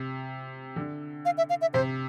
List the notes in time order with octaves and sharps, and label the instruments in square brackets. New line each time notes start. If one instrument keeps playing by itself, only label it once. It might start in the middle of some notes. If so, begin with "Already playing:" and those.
Already playing: [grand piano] C3
D3
[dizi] F5
E5
F5
E5
[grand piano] C3 [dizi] C5